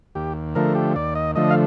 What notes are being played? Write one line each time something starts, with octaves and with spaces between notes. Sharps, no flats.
D#2 G4
D3 F3 A3 A#4
G4
D#2 D5
D#5
D3 F3 A3 D#5
F5